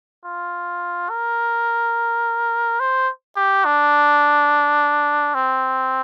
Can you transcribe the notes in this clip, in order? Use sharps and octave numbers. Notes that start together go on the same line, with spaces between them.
F4
A#4
C5
G4
D4
C4